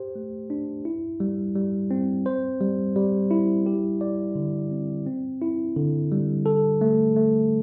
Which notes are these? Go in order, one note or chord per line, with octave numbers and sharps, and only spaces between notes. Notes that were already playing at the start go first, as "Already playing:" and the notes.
Already playing: G4 C5
A3
D4
E4
G3
G3
C4
C5
G3
G3
E4
G4
D5
D3
C4
C4
E4
D3
G3
A4
A3
A3